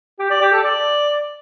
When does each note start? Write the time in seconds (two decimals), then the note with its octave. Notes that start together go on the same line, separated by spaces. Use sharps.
0.19 G4
0.30 D5
0.41 G4
0.52 A4
0.64 D5